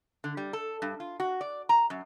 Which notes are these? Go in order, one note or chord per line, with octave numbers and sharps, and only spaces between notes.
D3
G3
A4
G2
F4
F#4
D5
A#5
F#2